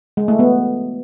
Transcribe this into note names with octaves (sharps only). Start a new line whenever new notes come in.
G#3
A3
B3